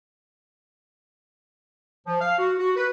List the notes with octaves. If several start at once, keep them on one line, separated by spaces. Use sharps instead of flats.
F3
F5
F#4
F#4
B4